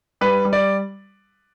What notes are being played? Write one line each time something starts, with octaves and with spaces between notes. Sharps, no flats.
G3 B4
G3
D5